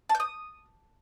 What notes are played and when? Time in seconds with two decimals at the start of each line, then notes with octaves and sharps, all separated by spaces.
0.09 A5
0.15 G6
0.20 D#6